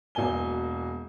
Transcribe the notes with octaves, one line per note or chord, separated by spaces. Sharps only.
E1 B2 A#3 G#5 G7